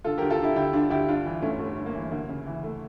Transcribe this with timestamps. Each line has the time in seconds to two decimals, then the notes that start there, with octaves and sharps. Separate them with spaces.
0.04 D3 F4 A4
0.18 D2 G4 A#4
0.30 F4 A4
0.39 D3 E4 G4
0.56 D2 E4 G4
0.73 D3 D4 F4
0.91 D2 E4 G4
1.08 G2 D4 F4
1.26 E3
1.42 G1 A3 C#4
1.60 G1 A3
1.78 G2
1.86 A#3
1.95 E3
2.12 D2 A#3
2.29 C#3
2.46 E3
2.64 A3